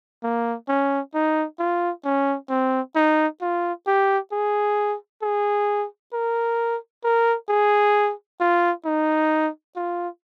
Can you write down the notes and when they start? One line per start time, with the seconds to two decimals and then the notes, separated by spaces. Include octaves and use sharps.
0.24 A#3
0.69 C#4
1.14 D#4
1.59 F4
2.05 C#4
2.49 C4
2.96 D#4
3.41 F4
3.87 G4
4.32 G#4
5.23 G#4
6.14 A#4
7.04 A#4
7.49 G#4
8.40 F4
8.86 D#4
9.76 F4